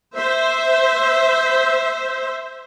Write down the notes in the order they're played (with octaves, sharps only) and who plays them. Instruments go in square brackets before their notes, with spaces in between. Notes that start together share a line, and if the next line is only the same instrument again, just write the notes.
[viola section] C5 E5